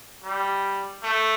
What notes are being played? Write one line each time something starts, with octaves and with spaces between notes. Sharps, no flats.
G3
A3